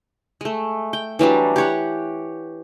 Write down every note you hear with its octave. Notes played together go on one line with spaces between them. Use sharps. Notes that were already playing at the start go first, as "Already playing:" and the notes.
G#3 A3
G5
E3 F#3 G3 D4
G4 C#5 F#5